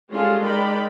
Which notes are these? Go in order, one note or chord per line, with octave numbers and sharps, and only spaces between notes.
G3 G#3 C#4 F4 G#4 A4
G#3 D#4 A#4 D5 G5 B5